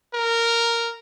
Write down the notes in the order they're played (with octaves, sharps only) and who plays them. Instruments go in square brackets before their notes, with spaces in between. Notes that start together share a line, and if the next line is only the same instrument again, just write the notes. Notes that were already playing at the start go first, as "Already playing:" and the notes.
[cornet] A#4